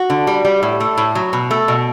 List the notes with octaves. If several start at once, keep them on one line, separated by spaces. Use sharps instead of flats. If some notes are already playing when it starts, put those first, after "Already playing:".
Already playing: F#4
D3
G3
G3
A2
A3
A2
F#3
B2
A3
B2